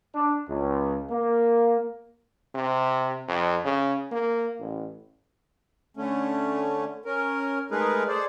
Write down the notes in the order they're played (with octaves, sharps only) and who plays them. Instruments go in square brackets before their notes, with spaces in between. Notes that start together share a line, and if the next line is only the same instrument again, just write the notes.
[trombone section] D4
C#2
A#3
[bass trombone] C3
F2
C#3
A#3
A1
[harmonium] D3 A3 C#4
C#4 A#4
G#3 A3 D#4 G#4 A#4 B4
G#4 A4 C5 D5